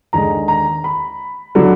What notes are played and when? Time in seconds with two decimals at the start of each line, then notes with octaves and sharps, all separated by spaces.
0.13 D#2 D3 G#3 A#5
0.48 A#5
0.84 B5
1.55 D3 F#3